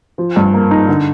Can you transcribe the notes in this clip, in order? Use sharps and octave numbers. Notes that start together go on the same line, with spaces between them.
F3
G2
A#3
D#4
D3